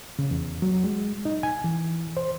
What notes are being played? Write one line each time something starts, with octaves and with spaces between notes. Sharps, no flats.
C#3
E2
F#3
G#3
D#4
G#5
E3
C5